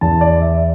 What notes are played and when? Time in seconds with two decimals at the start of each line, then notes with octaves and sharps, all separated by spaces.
0.01 E2 E3 A5
0.21 D5
0.41 E5